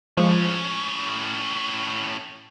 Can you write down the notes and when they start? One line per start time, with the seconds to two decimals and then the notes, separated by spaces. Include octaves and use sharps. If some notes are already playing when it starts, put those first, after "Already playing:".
0.17 A2 F3 G#3 C#4